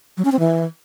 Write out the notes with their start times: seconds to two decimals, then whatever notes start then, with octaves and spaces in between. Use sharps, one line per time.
0.17 F#3
0.25 C#4
0.32 C4
0.39 E3